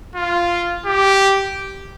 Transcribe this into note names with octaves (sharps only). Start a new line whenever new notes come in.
F4
G4